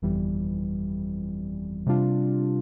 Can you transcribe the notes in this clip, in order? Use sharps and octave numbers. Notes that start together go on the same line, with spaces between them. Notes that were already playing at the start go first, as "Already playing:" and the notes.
G1 F2 E3 G3
C3 G3 D4 F4